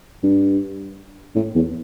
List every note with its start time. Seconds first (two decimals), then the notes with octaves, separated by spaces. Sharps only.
0.23 G2
1.36 A2
1.55 E2